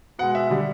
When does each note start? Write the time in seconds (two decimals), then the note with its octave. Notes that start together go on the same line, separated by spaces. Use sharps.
0.19 B2 G#3 F#5
0.35 E5
0.51 D3 G3